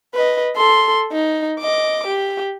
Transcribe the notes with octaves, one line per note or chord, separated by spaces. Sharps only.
B4 D#5
A4 C6
D#4
D#5 D6
G4